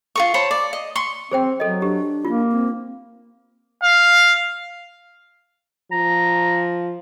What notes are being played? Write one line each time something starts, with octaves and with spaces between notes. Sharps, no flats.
F4 A#4 C#6
C5 C#5 A5 B5
D5
D#5
C6 C#6
C4 G#4 C5 G5
F#3 A4 D#5
D4 G4
A#3 F4
C4
F5
F3 A#5